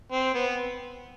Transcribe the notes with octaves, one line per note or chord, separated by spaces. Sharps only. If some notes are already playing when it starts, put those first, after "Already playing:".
C4
B3